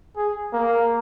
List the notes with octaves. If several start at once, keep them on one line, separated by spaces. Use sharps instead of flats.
G#4
A#3